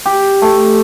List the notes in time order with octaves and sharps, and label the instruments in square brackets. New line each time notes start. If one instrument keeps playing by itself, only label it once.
[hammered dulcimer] G4
A3